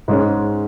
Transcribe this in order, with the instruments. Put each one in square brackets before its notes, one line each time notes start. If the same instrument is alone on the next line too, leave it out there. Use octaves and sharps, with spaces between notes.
[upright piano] G#2 G#3 C#4